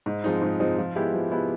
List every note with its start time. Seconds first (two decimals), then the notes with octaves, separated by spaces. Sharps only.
0.06 G#2
0.24 F3 G#3 C4 D#4
0.42 G#2
0.60 F3 G#3 C4 D#4
0.79 F3
0.96 G#3 B3 E4 G4
1.13 F3
1.31 G#3 B3 E4 G4